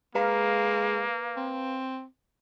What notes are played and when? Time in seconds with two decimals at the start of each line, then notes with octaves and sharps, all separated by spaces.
0.15 G#3 A#3 B4 F5 A#5
1.37 C4